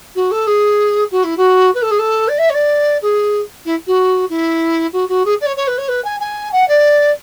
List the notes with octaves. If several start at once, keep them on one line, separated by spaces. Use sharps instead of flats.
F#4
A4
G#4
F#4
E4
F#4
B4
A4
G#4
A4
D5
E5
C#5
D5
G#4
E4
F#4
E4
F#4
F#4
G#4
D5
C#5
C#5
B4
C#5
B4
G#5
G#5
F#5
D5